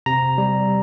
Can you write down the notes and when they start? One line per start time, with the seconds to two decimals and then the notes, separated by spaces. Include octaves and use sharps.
0.06 C3 A#5
0.38 G3